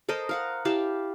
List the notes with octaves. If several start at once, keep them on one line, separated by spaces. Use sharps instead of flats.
A4 A#4 C5 D#5
A#4 F5 F#5
E4 G4 F5 A5